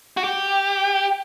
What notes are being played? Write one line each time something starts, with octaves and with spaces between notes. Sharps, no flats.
F#4
G4